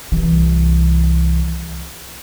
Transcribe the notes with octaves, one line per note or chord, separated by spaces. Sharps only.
C2 E3